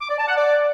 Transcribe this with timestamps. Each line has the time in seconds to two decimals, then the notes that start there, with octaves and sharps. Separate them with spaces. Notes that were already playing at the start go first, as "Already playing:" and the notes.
0.01 D6
0.10 D5
0.19 A5
0.28 F#5
0.36 D5